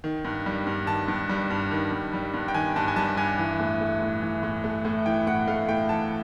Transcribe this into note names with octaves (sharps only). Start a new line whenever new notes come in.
D#3
G2
G3
G2
D#3 A5
G2
G3
G2
D#3
G2
G3
G2
G5
D#3 G#5
G2 A5
G#5
G3 A5
G2 G#5
E3
A2
A3
A2
E3
A2
A3
A2
E3 G5
A2 F#5
A3 F5
A2 G5
E3 A5